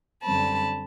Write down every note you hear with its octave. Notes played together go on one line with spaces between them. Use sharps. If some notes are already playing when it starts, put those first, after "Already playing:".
F#2 D3 G3 C4 A5 B5